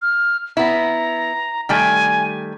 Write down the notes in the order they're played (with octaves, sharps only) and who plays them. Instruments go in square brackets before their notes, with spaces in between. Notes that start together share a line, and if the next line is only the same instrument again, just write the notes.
[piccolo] F6
[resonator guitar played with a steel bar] B3 E4 [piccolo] A#5
[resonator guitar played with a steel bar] D#3 G3 A3 [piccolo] G#5